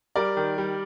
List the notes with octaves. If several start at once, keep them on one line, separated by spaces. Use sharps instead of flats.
G3 A#4 D5
D#3
G3